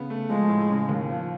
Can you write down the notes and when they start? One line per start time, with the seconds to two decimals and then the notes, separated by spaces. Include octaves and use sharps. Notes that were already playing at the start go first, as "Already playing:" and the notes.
Already playing: C#3 B3
0.10 A3
0.30 F3 G#3
0.49 A2
0.70 C#3
0.89 D#2
1.09 F3